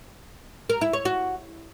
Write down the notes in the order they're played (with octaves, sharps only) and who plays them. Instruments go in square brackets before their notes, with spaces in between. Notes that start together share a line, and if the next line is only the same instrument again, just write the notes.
[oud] A#4
E4
C#5
F#4